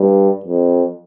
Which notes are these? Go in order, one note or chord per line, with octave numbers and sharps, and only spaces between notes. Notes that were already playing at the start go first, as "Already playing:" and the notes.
Already playing: G2
F2